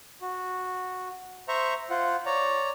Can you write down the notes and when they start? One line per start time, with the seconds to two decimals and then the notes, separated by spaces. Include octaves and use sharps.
0.21 F#4
1.48 C5 E5 A#5 C#6
1.90 F4 C5 F#5
2.26 C#5 D5 A#5